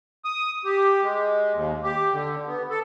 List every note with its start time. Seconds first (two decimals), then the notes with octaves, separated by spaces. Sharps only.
0.25 D#6
0.65 G4
1.03 G#3
1.54 D#2
1.83 G4
2.12 D3
2.47 B3
2.70 A4